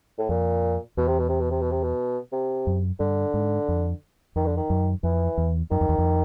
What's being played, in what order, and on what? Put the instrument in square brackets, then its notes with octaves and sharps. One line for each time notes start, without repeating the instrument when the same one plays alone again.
[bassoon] A2
[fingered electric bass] F2 [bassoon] A#2
[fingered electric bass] E2 [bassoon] B2
[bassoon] C3
B2
C3
B2
C3
B2
C3
B2
C3
[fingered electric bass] F#2
[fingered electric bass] G2 [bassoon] D3
[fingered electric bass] G#2
F2
[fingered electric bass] F2 [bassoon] D#3
[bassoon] D3
D#3
[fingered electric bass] F#2
[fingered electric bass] F2 [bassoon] E3
[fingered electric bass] E2
[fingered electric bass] F#2 [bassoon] D#3
[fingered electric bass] F2
E2
F2